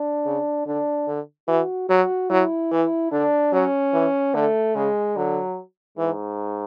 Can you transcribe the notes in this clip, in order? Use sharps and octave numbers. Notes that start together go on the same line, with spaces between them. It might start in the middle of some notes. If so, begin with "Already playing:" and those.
Already playing: D4
C#3
D3 D4
D3
E3 F#4
F#3 F#4
F#3 E4
E3
D3 D4
F#3 C#4
E3
D3 A3
C#3 G#3
D3 F#3
G#2 E3